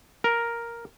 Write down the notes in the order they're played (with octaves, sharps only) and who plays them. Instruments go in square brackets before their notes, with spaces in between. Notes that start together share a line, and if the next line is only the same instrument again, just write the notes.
[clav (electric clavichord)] A#4